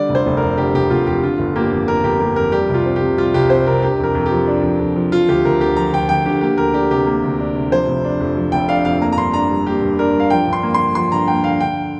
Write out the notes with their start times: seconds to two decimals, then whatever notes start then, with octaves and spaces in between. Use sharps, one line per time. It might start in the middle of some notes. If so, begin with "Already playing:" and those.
Already playing: D3 G3 D5
0.09 F1
0.15 C5
0.26 F1
0.37 A#4
0.43 F2
0.58 D3 G4
0.74 F1 G4
0.90 F1 F4
1.07 F2 G4
1.23 D3 F4
1.39 G1
1.56 A#3 G4
1.72 F2
1.88 D3 A#4
2.04 G1 G4
2.20 A#3 G4
2.36 F2 A#4
2.52 G3 G4
2.68 C2
2.74 F4
2.86 C4
2.96 G4
3.01 C3
3.17 G3 F4
3.34 C2 G4
3.50 C4 C5
3.67 C3 A#4
3.82 D4 G4
3.99 F2 A#4
4.15 F2
4.26 G4
4.31 F3
4.47 D4
4.63 F2
4.79 F2
4.96 F3
5.12 F3 F4
5.28 D2 G4
5.45 D2 A#4
5.61 D3 G4
5.76 F3 A#5
5.93 D2 G5
6.09 D2 G5
6.26 D3 G4
6.41 A#3 G4
6.58 D2 A#4
6.74 D4 G4
6.91 C3 G4
7.06 A#3
7.24 D2
7.40 D4
7.55 C3
7.72 F3 C5
7.88 F1
8.05 D4
8.20 F2
8.37 F3
8.52 F1 G5
8.69 D4 F5
8.85 F2 F5
9.02 A#3 A#5
9.12 A#5
9.17 G2 C6
9.34 D4 A#5
9.50 G3
9.66 A#3 G4
9.82 G2
9.99 D4 A#4
10.14 G3
10.20 F5
10.30 F3 G5
10.47 G2
10.53 C6
10.63 A#3
10.74 C6
10.80 D3
10.95 F3 C6
11.12 G2 A#5
11.28 A#3 G5
11.44 D3 F5
11.60 D3 G5